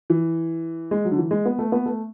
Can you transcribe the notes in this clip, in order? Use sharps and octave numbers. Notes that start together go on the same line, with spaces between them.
E3
G#3
F#3
D3
E3
G#3
B3
A3
B3
A3